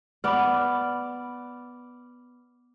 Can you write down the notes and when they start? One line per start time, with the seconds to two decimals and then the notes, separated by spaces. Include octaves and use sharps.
0.24 B3 D5 B5 D6 F6